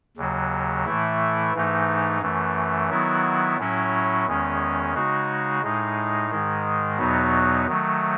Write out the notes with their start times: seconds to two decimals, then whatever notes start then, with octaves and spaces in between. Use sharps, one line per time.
0.17 D#2 C#3 F#3
0.85 A2 E3 A3 E4
1.54 G#2 E3 A3 D#4
2.21 F#2 E3 A3
2.89 D#3 F#3 B3 E4
3.58 A2 F#3 C#4 E4
4.26 E2 D#3 G#3 C#4
4.94 C#3 G#3 D#4 F#4
5.63 A2 G#3 D#4
6.30 G#2 D#3 G#3
6.98 E2 B2 F#3 B3 D#4
7.67 D#3 F#3 A3